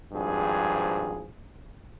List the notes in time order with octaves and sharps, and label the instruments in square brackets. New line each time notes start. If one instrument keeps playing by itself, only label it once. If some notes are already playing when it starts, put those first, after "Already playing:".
[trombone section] G#1 G2 F3 G#4